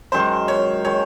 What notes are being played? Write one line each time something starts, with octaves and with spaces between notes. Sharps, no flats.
F#2 D#3 G#3 C5
C#5
D#3 G#3 C#5